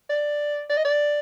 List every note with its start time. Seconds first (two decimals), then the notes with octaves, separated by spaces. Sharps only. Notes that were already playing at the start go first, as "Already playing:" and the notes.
0.09 D5
0.70 D5
0.77 D#5
0.85 D5